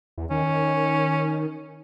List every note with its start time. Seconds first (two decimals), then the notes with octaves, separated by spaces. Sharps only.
0.18 E2
0.31 D#3 C#4